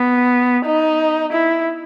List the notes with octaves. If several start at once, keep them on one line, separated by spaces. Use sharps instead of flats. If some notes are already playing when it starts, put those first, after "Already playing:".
Already playing: B3
D#4
E4